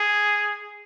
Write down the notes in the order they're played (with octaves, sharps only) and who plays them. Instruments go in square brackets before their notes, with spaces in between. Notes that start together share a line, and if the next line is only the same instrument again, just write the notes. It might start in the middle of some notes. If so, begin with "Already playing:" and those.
Already playing: [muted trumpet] G#4